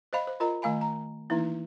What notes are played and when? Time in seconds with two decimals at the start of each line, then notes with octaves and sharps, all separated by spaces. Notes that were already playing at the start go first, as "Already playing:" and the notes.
0.13 C5 D#5 F5 B5
0.27 C5
0.40 F4 A#4 D#5 A#5
0.62 D#3 A3 F5 G#5 B5
0.81 A#5
1.30 E3 A#3 D#4 E4